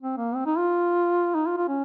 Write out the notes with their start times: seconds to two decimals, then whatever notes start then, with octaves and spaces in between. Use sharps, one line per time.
0.02 C4
0.18 A#3
0.35 C4
0.46 D#4
0.58 F4
1.35 D#4
1.47 F4
1.57 F4
1.68 C#4